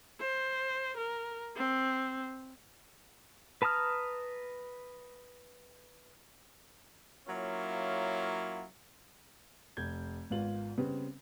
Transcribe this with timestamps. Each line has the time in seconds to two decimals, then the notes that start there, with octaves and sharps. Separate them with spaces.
0.20 C5
0.97 A#4
1.56 C4
3.62 B4 A5 A#5 D#6 F6
7.27 F#3 A#3 C#4 E4 F4
9.77 F1 G6 G#6
10.30 G#1 G#2 B3 F4 F#7
10.78 C#3 G3 B3 C4